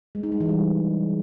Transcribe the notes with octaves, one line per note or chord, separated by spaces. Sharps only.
G#3
D#4
G#3
E3
G3